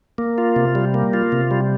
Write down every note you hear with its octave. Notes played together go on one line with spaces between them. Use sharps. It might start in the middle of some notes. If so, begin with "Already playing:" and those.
A#3
F4
C3
G3
A#3
F4
C3
G3